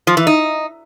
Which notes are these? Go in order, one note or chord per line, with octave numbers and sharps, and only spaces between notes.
F3
E3
D#4